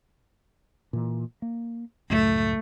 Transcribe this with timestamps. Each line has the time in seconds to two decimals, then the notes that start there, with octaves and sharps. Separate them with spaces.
0.93 A#2 E3
1.42 A#3
2.10 C#2 F#2 A2 A3